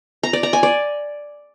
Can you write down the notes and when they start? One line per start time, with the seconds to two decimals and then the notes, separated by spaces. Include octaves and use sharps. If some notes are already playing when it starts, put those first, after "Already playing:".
0.23 A#5
0.33 D5
0.43 A#5
0.53 G#5
0.63 D5